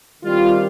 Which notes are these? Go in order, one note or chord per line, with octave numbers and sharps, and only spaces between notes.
D#3 G3 C4 F4